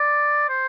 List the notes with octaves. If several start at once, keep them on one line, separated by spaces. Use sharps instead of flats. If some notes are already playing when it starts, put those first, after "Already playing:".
Already playing: D5
C5